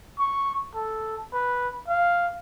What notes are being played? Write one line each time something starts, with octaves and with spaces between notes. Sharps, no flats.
C#6
A4
B4
F5